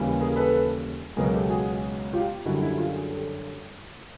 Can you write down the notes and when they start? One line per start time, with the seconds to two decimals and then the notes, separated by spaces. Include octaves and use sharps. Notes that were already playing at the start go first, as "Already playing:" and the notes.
Already playing: D#2 C#3 E3 G3
0.21 G#4 A#4
0.36 A4 B4
1.16 C#2 B2 F#3 G#4 A#4
1.34 G4 A4
1.50 F#4 G#4
2.13 F4 G4
2.45 F#2 D3 G3 E4 F#4
2.62 E4 F#4
2.78 F4 G4
2.94 F#4 G#4
3.09 G4 A4